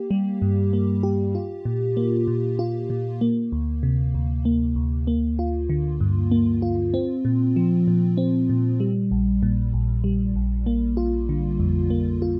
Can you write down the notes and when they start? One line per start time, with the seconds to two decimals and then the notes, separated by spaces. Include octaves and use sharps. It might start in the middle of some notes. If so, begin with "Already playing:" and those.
Already playing: A#3 G4
0.11 G3
0.42 G2
0.73 A#3
1.03 G4
1.35 F4
1.65 A#2
1.97 A#3
2.28 A#2
2.59 F4
2.90 A#2
3.21 A#3
3.52 D2
3.83 C3
4.14 D2
4.45 A#3
4.76 D2
5.07 A#3
5.39 F4
5.70 D3
6.00 G2
6.31 A#3
6.62 F4
6.94 C4
7.25 A#2
7.56 F3
7.88 A#2
8.18 C4
8.50 A#2
8.80 G3
9.11 A#1
9.43 A#2
9.74 A#1
10.04 G3
10.36 A#1
10.66 A#3
10.97 F4
11.29 D3
11.60 F2
11.90 A#3
12.22 F4